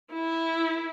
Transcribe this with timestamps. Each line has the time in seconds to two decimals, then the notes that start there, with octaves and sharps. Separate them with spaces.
0.13 E4